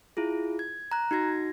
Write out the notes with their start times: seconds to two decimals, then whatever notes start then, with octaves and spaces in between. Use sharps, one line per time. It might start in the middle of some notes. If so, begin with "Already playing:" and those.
0.17 E4 F4 G#4
0.59 G#6
0.92 A#5 F#6
1.11 D#4 F#4 G#6 A#6